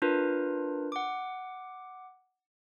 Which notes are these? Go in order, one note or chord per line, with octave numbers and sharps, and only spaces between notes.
D4 F4 A#4 B4
F#5 D6